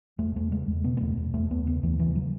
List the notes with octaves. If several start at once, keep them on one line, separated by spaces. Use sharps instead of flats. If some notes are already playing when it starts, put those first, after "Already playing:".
E2 A3
E2 A3
C#3 G#3
E2
B2 B3
B3
E2 A3
E2
E2 A3
D#2 B3
C#3 B3
D#2 E3
C#3 E3
C#3 F#3